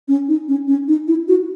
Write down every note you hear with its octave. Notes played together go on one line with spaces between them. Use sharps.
C#4
D#4
C#4
C#4
D#4
E4
F#4